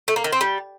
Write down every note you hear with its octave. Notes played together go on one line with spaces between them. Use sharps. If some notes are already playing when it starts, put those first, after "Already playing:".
A3
A#3
D#3
C4
G3